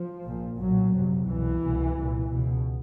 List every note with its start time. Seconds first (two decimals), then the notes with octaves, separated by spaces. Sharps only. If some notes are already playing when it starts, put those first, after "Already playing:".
Already playing: F3
0.24 A#1 A#2
0.58 B1 A#2 F#3
0.92 G1 F2 C3
1.26 C2 B2 E3
1.61 C2 B2
1.95 C2 A#2
2.30 C#2 B2